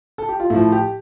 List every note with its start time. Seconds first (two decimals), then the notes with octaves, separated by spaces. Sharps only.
0.18 A4
0.29 G4
0.40 F4
0.50 A2 F3 E4
0.72 G4